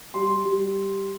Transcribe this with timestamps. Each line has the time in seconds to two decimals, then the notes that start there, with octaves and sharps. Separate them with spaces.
0.14 G3 C6
0.44 G3